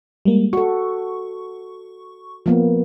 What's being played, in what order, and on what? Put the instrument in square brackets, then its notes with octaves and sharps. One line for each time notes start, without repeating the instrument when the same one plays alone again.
[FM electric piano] G3 G#3 A#3
[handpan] F#4 A4 [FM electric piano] C#6
[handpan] F3 A#3 B3